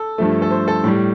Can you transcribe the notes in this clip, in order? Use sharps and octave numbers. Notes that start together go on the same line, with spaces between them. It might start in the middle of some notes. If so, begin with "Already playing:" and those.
Already playing: A4
G2 F3 A3
A4
C5
A4
A2 G3